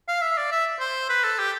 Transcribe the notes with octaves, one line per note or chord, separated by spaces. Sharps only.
F5
E5
D5
E5
C5
B4
A4
G4